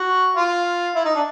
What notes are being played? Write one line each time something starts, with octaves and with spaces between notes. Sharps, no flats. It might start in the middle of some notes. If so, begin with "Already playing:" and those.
Already playing: F#4
F4
E4
D#4
D4